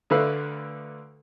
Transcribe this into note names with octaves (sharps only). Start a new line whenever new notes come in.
D2 D3 A3 B4 F5 F#6